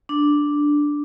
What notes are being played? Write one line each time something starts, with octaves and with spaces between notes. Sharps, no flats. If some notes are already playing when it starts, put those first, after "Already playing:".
D4